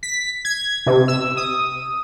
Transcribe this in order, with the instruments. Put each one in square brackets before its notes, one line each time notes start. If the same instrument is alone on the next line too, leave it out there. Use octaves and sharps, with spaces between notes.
[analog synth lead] B6
G#6
C3
E6
D#6